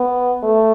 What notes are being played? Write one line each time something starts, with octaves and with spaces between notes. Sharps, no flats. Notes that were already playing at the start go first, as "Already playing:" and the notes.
Already playing: B3
A3